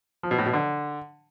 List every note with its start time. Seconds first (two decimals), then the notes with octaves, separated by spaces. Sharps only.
0.23 F3
0.31 B2
0.38 A2
0.46 B2
0.53 D3